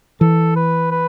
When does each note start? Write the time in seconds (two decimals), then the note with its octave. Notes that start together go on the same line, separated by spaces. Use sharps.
0.21 E3 A4
0.56 B4
0.91 B4